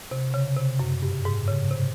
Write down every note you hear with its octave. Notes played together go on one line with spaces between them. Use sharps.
C3
C#3
C3
F#2
G2
G#2
C#3
C3